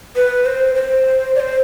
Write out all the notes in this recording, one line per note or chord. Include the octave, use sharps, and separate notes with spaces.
B4
C5
C5
D5
C5